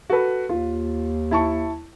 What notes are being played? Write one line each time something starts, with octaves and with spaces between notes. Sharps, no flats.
F#4 A4 B4
D#2 F4
E4 A5 C#6